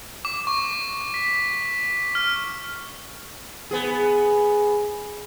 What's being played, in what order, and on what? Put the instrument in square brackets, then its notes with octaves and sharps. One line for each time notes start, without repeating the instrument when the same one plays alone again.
[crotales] D6
C#6
B6
F6
[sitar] B3 G#4